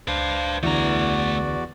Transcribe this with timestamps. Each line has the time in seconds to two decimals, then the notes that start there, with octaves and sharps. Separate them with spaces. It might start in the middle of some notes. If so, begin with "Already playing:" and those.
0.08 C#2 D4 B4 C5 F5
0.63 E2 D3 E3 A3 F#4 D5 A#5